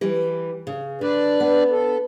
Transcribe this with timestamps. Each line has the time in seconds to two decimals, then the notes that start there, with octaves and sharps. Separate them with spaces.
0.01 E3 G3
0.67 C#3
1.01 D3 D4 B4 D5
1.40 B3
1.71 A4